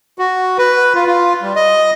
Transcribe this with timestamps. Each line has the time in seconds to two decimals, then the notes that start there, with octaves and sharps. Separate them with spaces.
0.19 F#4
0.58 B4
0.94 F4
1.07 F4
1.42 G3
1.56 D#5